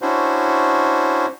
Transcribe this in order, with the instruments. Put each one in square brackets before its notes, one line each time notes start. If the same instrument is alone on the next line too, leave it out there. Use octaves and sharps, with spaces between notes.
[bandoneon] C#4 D4 E4 F#4 C5